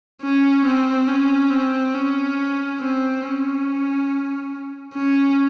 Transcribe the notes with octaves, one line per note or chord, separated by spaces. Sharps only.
C#4
C4
C#4
C4
C#4
C4
C#4
C#4